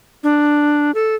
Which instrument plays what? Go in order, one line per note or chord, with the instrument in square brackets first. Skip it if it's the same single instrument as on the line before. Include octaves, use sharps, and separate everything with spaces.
[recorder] D4
A4